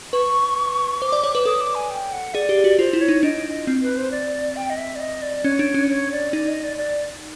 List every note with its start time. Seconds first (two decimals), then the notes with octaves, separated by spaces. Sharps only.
0.13 B4 C#6
1.01 C5 D6
1.12 D5
1.24 C#5
1.35 B4
1.46 A4 D#6
1.61 D6
1.75 G#5
1.90 G5
2.12 F#5
2.34 G#4 D5
2.49 G4
2.64 F#4
2.79 F4 C5
2.93 E4
3.01 C#5
3.08 D#4
3.23 D4 D#5
3.67 C4
3.82 B4
3.97 C5
4.11 D5
4.56 G5
4.70 D#5
4.78 E5
4.96 D5
5.00 D#5
5.22 D5
5.44 C#4 C#5
5.59 D4
5.74 C#4
5.89 C#5
6.12 D5
6.33 D#4 D5
6.48 D#5
6.63 D5
6.78 D5